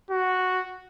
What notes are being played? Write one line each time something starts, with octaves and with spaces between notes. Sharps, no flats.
F#4